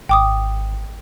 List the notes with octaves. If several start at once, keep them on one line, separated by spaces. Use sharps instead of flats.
G#1 G5 D6 D#6